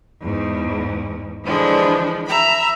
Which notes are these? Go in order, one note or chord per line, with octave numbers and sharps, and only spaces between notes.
E2 G#2
D3 E3 F3 G#3 D4
E5 A#5 B5